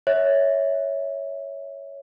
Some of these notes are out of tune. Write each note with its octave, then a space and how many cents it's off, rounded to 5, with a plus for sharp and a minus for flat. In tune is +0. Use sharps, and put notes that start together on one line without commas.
C#5 +5 E5 -20